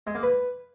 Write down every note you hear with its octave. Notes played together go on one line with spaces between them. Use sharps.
G#3
A#3
B4